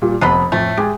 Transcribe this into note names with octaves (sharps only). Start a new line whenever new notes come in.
A#2 G3 F4
F1 B3 D4 D#5 B5
F2 A2 A3
G#3 G4 G#4